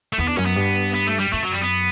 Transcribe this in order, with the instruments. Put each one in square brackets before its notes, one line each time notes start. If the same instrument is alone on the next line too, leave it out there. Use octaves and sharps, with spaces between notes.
[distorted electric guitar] A3
[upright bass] E2 [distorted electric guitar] B3
[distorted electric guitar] D4
[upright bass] F#2 [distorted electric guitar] C#4
[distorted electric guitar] B3
[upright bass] G2
[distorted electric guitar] B3
A3
G3
[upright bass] F#2 [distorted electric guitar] A3
[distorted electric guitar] F#3
G3
B3